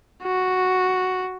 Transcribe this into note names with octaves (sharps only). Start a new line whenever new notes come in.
F#4